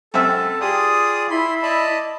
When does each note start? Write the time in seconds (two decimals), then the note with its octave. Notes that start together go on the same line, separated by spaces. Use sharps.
0.14 F#2 C4 A4 E5
0.61 F4 G4 G#4 D5 D#6
1.30 E4 B5 C6
1.62 D5 D#5 A5 B5